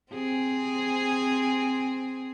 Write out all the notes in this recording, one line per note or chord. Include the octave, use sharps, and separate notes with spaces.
C4 G#4